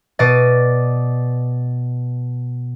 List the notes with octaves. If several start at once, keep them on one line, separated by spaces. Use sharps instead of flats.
B2 D5 D#5 A6